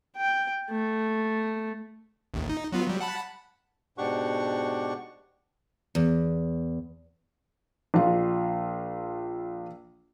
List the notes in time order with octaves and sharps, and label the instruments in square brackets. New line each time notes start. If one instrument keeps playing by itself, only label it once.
[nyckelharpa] G5
A3
[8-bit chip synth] A1 D#2
D#4
F#3 B3 F4
F#3 G3
F#5 A5 B5
[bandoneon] G#2 B2 D4 G4 F#5 C#6
[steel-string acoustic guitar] E2
[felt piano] A#1 F4